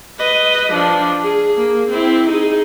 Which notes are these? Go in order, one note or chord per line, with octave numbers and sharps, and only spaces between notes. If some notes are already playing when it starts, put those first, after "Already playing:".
B4 D#5
F3 D4
G#4
A#3
C4 E4
D#4 G#4